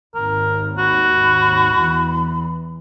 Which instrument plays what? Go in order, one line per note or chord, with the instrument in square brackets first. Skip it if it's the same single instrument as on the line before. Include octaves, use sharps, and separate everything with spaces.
[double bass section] G#1 D#2 [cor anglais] A#4
[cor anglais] F#4 [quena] B5
[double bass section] E2 E3